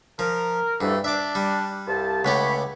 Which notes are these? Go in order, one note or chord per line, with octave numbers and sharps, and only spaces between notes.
F3 A#4
D2 G2 E3 A3
D4 E5 D6
G3
C2 G2 A5
C#2 A3 G4 C#5 F#5 B5